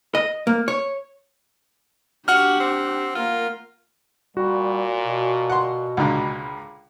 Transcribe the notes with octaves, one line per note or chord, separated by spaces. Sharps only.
D#5
A#3
C#5
D4 F#4 G4 F#5 F6
C4
A#3 F4 A#4
A#2 G3 F#4
B2
F#5 C6
C#2 A#2 D3